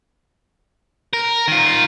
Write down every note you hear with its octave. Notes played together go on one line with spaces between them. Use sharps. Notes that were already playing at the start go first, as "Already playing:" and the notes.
A#4
D#3 F4